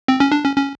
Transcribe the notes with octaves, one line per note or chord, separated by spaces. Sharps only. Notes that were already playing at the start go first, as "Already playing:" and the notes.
C4
C#4
D4
C#4
C#4